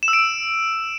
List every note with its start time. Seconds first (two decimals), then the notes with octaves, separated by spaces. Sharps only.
0.03 E7
0.08 E6
0.13 D7